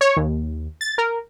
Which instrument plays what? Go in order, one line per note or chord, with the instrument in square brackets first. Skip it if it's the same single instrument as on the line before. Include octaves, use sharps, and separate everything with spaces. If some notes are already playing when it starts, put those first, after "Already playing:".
[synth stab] C#5
D#2
A6
A#4